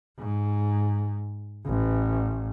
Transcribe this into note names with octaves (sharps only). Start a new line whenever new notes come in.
G#2
A1